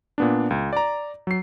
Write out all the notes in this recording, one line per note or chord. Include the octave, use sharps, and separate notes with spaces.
A#2 B3 D4
C#2
D5 A#5
F#3 C7